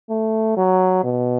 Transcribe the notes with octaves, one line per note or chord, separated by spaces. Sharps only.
A3
F#3
B2